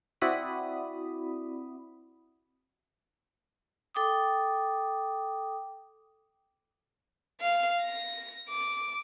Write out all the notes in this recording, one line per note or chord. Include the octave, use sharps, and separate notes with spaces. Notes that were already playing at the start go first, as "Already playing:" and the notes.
C4 E4 F#4 D5 B5 D#6
A4 G5 D6 D#6
F5
A#6
D6